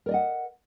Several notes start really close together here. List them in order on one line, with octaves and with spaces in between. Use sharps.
A#4 D5 D#5 F#5